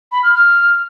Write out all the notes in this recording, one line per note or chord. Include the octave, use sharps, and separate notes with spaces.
B5
F6
F6